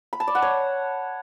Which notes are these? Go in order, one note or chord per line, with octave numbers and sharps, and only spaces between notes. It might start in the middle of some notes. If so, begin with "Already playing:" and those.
B5
A5
D5
F#5
C#5